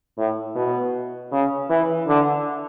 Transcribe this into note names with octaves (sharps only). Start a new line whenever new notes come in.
A2
B2
C#3
E3
D3